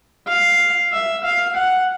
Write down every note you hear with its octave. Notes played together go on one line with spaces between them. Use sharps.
F5
E5
F5
F#5